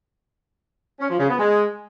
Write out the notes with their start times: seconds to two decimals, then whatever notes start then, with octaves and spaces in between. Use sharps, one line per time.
0.99 C#4
1.09 F3
1.19 C#3
1.28 B3
1.38 G#3